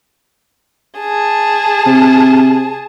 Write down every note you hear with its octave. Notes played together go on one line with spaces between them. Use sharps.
G#4 A5
C3